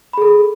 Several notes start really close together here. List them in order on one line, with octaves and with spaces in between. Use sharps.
B5 G#4 A4